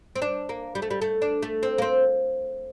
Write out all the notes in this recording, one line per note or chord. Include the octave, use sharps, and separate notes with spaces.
C4
D4
A#3
G3
A3
G3
A3
D4
A3
C4
A#3
C4